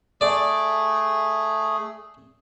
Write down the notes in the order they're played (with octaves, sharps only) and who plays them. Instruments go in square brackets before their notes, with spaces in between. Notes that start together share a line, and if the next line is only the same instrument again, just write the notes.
[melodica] A3 G#4 [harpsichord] D5